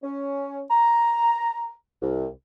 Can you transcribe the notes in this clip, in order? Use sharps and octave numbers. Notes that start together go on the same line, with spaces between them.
C#4
A#5
C2